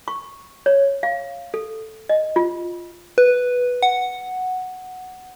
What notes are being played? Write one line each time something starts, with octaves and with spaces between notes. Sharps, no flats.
C#6
C#5
F5
A4
D#5
F4
B4
F#5